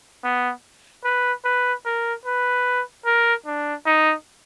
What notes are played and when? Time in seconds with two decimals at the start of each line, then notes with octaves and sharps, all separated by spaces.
0.24 B3
1.04 B4
1.45 B4
1.85 A#4
2.25 B4
3.06 A#4
3.46 D4
3.86 D#4